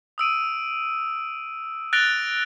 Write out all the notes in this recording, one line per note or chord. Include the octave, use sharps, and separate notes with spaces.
D#6 E6 D7 D#7
F#6 A6 A#6 D7 F7 G7